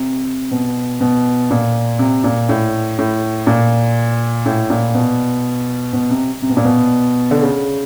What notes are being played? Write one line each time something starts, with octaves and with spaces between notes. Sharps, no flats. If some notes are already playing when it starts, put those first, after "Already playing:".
Already playing: C3
B2
B2
A#2
C3
A#2
A2
A2
A#2
A2
A#2
B2
B2
C3
C3
B2
A#2
B2
D3
C#3